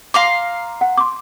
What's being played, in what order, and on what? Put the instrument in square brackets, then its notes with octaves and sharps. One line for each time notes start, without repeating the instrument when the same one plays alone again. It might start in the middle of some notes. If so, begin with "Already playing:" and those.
[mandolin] F5 A#5 C6 [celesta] D6
[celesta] F#5
C6 D6